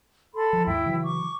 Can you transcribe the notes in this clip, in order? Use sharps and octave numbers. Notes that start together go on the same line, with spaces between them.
A4 B5 C6
F3
D#2 G#2 E4 G5
C#3 E3 F#3
C#6 D6